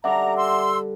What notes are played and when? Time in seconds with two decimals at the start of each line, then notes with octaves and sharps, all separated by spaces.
0.04 D3 G3 E5 F#5 A5 A#5 D6
0.36 C6 E6